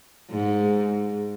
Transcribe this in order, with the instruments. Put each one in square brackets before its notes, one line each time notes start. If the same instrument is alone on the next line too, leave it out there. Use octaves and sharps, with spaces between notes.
[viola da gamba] G#2